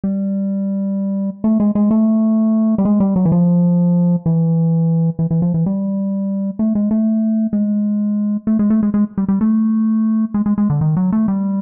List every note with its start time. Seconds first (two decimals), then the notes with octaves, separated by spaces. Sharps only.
0.04 G3
1.44 A3
1.60 G#3
1.75 G#3
1.91 A3
2.78 G3
2.85 G#3
3.00 G3
3.16 F#3
3.25 E3
3.32 F3
4.26 E3
5.19 E3
5.31 E3
5.42 F3
5.54 E3
5.66 G3
6.59 A3
6.75 G#3
6.91 A3
7.53 G#3
8.47 A3
8.59 G#3
8.70 A3
8.83 G#3
8.94 G#3
9.18 G3
9.28 G3
9.41 A3
10.34 G#3
10.46 G#3
10.58 G#3
10.70 D3
10.81 D#3
10.97 F#3
11.12 A3
11.28 G3